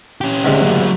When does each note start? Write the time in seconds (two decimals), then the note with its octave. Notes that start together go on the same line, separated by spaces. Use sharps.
0.21 C#4 G4
0.45 D2 G#2 C3 C#4 D#4
0.61 F#3 A#3